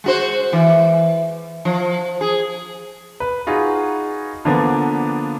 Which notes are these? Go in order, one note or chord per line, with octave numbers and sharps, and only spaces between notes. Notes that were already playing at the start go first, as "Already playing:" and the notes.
G#3 F#4 C5
E3
F3
G#4
B4
D#4 F4 F#4 G#4 B4
D3 F3 A#3 B3 D4